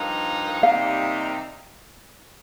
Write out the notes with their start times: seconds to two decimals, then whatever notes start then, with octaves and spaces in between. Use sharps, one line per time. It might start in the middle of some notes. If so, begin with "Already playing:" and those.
Already playing: G2 F3 A#3 D#4
0.62 C3 G3 A#3 D#4 F5